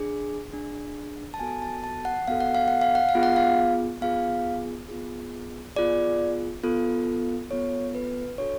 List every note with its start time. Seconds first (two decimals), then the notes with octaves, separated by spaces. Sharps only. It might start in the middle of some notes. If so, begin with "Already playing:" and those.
Already playing: D4 G#4
0.52 D4 G#4
1.34 A5
1.40 B3 F#4 A4 G#5
1.62 A5
1.84 A5
2.05 F#5
2.28 B3 F#4 A4 F5
2.40 F#5
2.55 F5
2.68 F#5
2.81 F5
2.95 F#5
3.09 F5
3.15 B3 F4 G#4
3.23 F#5
3.36 F5
4.01 B3 F4 G#4 F5
4.89 B3 F4 G#4
5.76 B3 F4 G#4 D5
6.64 B3 F4 A4
7.51 B3 F4 A4 C#5
7.95 B4
8.38 D4 F#4 A4 C#5